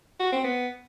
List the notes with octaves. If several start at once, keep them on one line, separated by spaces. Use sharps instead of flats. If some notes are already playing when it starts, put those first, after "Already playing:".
F#4
C4
B3